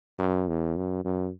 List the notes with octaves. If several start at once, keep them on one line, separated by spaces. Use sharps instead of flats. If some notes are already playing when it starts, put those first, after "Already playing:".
F#2
E2
F#2
F#2